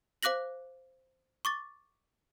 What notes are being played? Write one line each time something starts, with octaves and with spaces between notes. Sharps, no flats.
C5 F5 D6 F#6 A#6 F#7
C#6 D6 A6